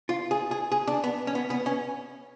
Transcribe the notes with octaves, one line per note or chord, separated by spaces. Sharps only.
F4
G#4
G#4
G#4
D4
B3
C#4
B3
B3
C#4